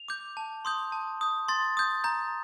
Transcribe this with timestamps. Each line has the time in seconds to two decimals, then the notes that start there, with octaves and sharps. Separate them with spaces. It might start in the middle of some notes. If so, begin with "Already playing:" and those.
Already playing: F7
0.08 D6 G6
0.37 A5
0.65 C6 D#6 G6
0.92 A5
1.21 D#6 G6
1.48 C6 A6
1.77 D#6 G6
2.04 A#5 G6